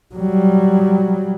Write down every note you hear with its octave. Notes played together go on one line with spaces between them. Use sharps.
F#3 G3